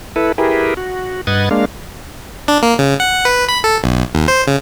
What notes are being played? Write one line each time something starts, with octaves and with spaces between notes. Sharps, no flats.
E4 A4 B4
E4 G4 G#4 A#4 B4
F#4
G2 B4 D#5 F#5 G#6 A6
G#3 A#3 D4 F5
D4
A#3
C#3
F#5
B4
B5
A4
B1
D#2
C5
C#3